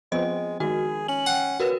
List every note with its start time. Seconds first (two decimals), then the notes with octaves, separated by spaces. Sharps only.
0.12 F3 G#3 B3 C4 D#5
0.60 D#3 G#3 F#4 G#4
1.08 C#4 F#7
1.26 F#5 G5
1.60 C#3 F#4 A#4 B4